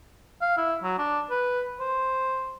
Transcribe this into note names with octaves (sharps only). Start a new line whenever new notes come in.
F5
E4
F#3
D4
B4
C5